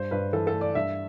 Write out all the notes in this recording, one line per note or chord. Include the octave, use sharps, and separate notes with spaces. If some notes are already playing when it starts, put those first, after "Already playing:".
Already playing: G2 C5
G2 B4
E3 A4
A4
A3
D5
G2 E5